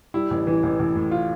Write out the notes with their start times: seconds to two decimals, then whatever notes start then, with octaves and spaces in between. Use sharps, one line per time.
0.14 G3 E4
0.31 A1
0.47 E3
0.63 A1
0.79 A1
0.95 A2
1.11 F4